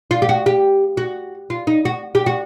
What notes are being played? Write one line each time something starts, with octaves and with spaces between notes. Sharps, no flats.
F4
G4
F#4
G4
F#4
F4
D#4
F#4
G4
F#4